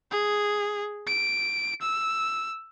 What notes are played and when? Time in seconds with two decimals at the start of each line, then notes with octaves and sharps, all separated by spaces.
0.11 G#4
1.07 D7
1.82 E6